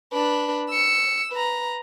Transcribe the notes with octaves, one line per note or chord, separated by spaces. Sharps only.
D4 B4
E6 C#7
B4 A#5